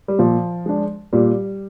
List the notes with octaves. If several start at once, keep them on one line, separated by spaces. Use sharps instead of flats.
G3
A#2 F3
G#3 D4
A#2 G3